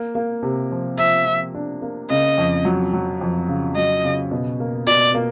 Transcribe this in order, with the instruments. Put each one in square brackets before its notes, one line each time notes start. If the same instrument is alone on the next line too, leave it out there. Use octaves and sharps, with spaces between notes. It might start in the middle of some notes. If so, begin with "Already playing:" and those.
Already playing: [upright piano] A#3
A#3
C3
F3
[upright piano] F3 [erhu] E5
[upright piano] F3
D4
A#3
[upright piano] C#3 [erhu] D#5
[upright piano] F2
F#3
F#3
F2
C#3
[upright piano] F#3 [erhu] D#5
[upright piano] C#3
B2
A#3
[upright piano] B2 [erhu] D5
[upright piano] A#3